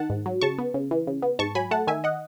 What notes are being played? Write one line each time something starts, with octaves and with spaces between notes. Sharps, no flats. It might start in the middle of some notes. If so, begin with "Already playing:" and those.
Already playing: D#3 F#5 A5
G#2
F#3
C#3 A5 C#6
B3
C#3
E3
C#3
B3
G#2 A5 C#6
F#3 G#5 B5
A3 F#5 A5
D#3 E5 G#5
D#5 F#5